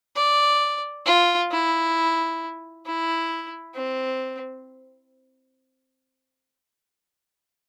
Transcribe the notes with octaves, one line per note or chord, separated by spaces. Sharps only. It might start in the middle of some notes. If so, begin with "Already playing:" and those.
D5
F4
E4
E4
C4